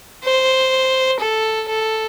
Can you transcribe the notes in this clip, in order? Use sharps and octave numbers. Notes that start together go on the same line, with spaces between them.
C5
A4
A4